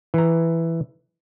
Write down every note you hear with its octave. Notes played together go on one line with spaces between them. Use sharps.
E3 A#5